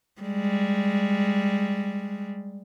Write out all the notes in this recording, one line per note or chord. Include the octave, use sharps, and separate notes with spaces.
G3 G#3